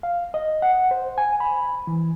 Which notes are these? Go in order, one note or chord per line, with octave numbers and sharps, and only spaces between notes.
F5
D#5
F#5
C5
G#5
B5
E3